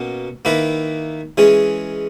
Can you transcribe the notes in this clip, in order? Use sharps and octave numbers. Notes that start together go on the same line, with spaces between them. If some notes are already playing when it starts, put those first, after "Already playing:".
Already playing: B2 A#3 C#4
D#3 A#3 E4 B4
E3 G#3 C#4 G#4